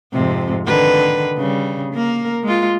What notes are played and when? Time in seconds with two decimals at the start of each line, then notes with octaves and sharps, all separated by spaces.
0.13 F2 G#2 C3
0.66 D3 D#3 B4
1.37 C#3 G3
1.93 A#3 A#4
2.43 G#3 F4